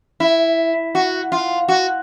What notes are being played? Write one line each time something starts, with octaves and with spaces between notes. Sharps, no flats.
E4
F#4
F4
F#4